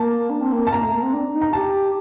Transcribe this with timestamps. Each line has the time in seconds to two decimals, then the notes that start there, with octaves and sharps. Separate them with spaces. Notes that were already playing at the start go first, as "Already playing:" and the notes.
Already playing: A#3 A5
0.30 D4
0.41 C4
0.52 A#3
0.67 A5
0.72 A#3 A#5
0.83 A3
0.93 A#3
1.02 C4
1.13 D4
1.33 D#4
1.42 A#5
1.53 G4 A5